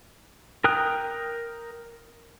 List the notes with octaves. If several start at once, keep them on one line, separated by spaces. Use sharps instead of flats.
A#4 G5 D#6 F#6